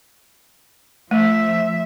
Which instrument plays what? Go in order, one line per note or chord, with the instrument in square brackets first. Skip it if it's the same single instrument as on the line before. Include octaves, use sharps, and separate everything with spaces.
[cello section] F3 E5 [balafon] A3